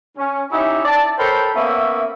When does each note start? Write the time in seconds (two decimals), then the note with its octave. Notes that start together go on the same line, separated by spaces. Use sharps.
0.18 C#4
0.51 C#4 D#4 E4 G4 D#5 E5
0.85 D5 A5
1.19 A4 A#4 C5 C#5 G5 B5
1.56 A#3 B3 C#4 E5